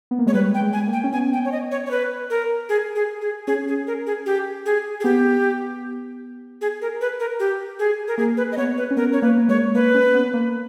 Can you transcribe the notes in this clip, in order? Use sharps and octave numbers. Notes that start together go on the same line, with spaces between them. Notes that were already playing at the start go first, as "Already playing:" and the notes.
B3
A#3
G#3 C#5
G3 B4
G5
G#3
G#5
A#3
G5
C#4
B3 G#5
G5
C#5
D#5
C#5
C#5
B4
A#4
G#4
G#4
G#4
C#4 G#4
G#4
A#4
G#4
G4
G#4
G#4
B3 G4
G#4
A#4
B4
A#4
G4
G#4
A#4
A#3 G#4
B4
D#5
B3 C#5
B4
C#4
B3 A#4
C#5
A#3 B4
A#3
G#3 C#5
A#3 B4
C#4
B3
A#3